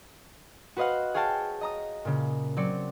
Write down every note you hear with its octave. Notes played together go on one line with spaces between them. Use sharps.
F#4 B4 C5 D#5 F5 F#5
G#4 C#5 F5 G5 A5
D#5 A#5 D#6
A#2 C#3
F#3 C4 D5 C#7